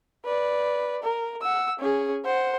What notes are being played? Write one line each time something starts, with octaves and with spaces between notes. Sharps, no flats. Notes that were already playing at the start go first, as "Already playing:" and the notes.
B4 D5
A#4
F#5 E6
C#4 G#4
C5 F#5